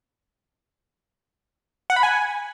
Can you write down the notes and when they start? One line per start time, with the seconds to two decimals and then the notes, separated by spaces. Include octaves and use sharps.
1.90 F#5
1.96 B5
2.03 G#5